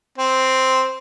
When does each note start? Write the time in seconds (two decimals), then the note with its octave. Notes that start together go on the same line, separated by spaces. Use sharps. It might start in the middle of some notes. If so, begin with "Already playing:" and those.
0.18 C4